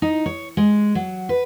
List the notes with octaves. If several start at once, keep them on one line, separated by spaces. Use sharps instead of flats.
D#4
C#5
G#3
F#3
B4